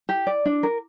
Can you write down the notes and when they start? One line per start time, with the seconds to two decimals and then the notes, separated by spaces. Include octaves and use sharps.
0.09 G4
0.27 D5
0.46 D4
0.63 A#4